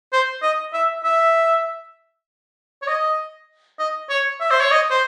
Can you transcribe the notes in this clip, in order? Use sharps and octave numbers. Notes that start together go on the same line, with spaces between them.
C5
D#5
E5
E5
C#5
D#5
D#5
C#5
E5
C5
C#5
D#5
C5